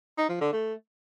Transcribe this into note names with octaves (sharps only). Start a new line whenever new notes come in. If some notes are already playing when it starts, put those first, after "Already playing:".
D#4
F3
D3
A3